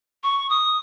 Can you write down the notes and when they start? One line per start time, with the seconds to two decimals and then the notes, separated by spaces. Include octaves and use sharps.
0.23 C#6
0.50 D#6